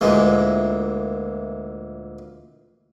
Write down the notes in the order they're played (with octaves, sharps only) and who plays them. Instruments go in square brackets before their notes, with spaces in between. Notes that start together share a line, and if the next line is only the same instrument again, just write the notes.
[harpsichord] D2 A#2 E3 G#3